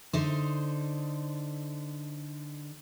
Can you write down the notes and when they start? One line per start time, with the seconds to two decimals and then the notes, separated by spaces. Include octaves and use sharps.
0.13 D3 D#4 C5